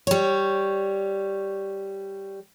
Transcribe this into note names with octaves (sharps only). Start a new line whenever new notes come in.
G3 C#5